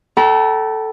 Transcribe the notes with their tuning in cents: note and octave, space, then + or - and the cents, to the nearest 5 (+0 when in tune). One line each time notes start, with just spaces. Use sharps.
A4 +0 G5 -40 A#5 +45